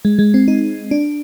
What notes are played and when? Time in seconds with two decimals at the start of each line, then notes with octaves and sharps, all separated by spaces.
0.05 G#3
0.19 G#3
0.34 C4
0.48 D#4
0.91 D4